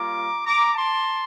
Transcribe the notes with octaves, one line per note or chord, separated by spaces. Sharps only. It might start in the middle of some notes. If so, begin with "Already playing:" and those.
Already playing: G3 A#3 F4 A#5 D6
A#5 D6
A5 C6